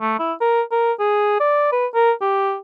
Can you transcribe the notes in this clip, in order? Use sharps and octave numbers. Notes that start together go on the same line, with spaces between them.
A3
E4
A#4
A#4
G#4
D5
B4
A#4
G4